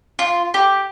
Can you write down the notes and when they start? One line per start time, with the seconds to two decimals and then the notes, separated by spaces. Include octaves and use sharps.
0.19 F4
0.54 G4